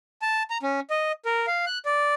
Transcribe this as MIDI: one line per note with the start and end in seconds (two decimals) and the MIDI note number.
0.22 0.43 81
0.50 0.58 82
0.63 0.80 61
0.90 1.12 75
1.25 1.46 70
1.47 1.65 77
1.66 1.78 90
1.85 2.15 74